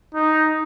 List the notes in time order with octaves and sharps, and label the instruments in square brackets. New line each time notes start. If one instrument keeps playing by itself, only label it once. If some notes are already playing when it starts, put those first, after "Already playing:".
[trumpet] D#4